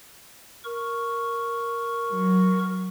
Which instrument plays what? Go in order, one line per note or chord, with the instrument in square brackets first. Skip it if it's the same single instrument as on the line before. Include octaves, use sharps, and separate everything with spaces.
[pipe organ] A#4 C#6
[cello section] F#3